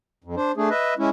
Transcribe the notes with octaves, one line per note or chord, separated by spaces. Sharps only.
F2
D4 C5
A3 D4 G#4
B4 D#5 E5
G#3 C#4 E4